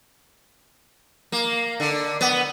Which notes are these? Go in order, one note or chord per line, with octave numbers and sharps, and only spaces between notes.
A#3
D3
B3